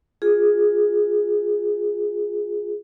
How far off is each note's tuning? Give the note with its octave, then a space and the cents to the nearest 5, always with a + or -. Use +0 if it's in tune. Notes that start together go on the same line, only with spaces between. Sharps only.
F4 +15 G#4 +0